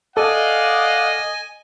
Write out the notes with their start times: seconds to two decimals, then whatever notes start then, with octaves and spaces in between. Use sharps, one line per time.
0.17 A4 D5 D#5 F5 F#5 G#5